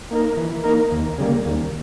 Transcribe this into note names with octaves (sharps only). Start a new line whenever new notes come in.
A#3 D#4 A#4
E3
A#3 D#4 A#4
D#2
C#3 G3 A#3
D#2